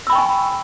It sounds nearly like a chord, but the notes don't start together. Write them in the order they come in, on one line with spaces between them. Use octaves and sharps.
E6 B5 G5 C#6 G#5